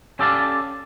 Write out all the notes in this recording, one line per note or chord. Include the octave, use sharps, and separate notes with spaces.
C#4 G4 A4 D5 F5 A5